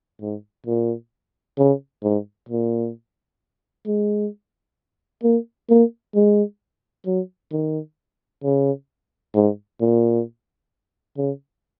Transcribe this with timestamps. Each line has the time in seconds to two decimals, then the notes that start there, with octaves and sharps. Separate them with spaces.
0.21 G#2
0.66 A#2
1.58 C#3
2.03 G#2
2.49 A#2
3.86 G#3
5.23 A#3
5.70 A#3
6.15 G#3
7.06 F#3
7.52 D#3
8.44 C#3
9.35 G#2
9.81 A#2
11.17 C#3